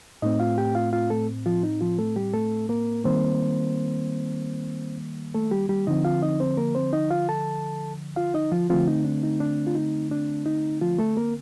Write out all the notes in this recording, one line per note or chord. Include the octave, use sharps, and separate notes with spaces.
A2 A3 C4 D#4 D#5
F4 F5
G4 G5
F4 F5
F4 F5
A3 A4
F3 F4
D#4
F3 F4
A3 A4
G3 G4
A3 A4
A#3 A#4
D#3 G3 A#3 C4 C5
A3 A4
G3 G4
G3 G4
D3 F3 C4 D#4 D#5
F4 F5
D#4 D#5
C4 C5
A#3 A#4
C4 C5
D#4 D#5
F4 F5
A4 A5
F4 F5
D#4 D#5
F3 F4
D3 F3 A3 C4 F4
D#4
D4
D#4
D4
F4
D#4
D4
D#4
F3 F4
A3 A4
A#3 A#4